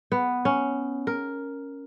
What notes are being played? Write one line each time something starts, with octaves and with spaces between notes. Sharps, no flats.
B3
C#4
A#4